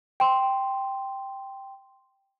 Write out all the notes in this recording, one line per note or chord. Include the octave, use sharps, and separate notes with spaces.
G5 C6